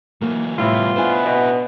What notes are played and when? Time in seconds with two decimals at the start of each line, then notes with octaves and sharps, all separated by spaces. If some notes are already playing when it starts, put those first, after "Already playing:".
0.22 E3 F#3 A#3
0.58 A2 C3 E3 G3 B3 E4 F4
0.96 B3 D4 E4 C5 G#5
1.25 B2